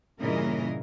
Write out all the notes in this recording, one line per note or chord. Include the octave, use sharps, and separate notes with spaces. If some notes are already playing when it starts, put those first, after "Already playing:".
G2 A#2 C#3 E3 A#4 D#5